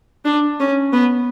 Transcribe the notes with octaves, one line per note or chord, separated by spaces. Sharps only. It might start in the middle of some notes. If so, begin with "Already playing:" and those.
D4
C#4
B3